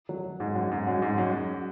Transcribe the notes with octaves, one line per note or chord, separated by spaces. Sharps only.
F#3
G#2
F#2
G#2
F#2
G#2
F#2